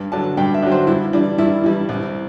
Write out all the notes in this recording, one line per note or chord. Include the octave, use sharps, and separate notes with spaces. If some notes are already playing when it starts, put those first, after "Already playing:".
Already playing: G2
D3 F#3 A5
G2 G5
E5
D3 F#3
C5
G2 E4
E3 G3 D4
G2 E4
E3 G3
C2